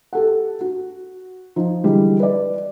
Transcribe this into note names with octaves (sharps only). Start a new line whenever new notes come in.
G4 A4 F#5
F#4
F3 D#4
D3 E3 G3 G#3
B4 D5